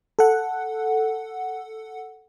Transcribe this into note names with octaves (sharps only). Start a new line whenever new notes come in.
A4 F#5